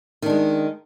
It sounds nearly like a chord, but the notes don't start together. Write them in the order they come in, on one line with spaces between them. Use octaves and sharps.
D#3 D4 G#3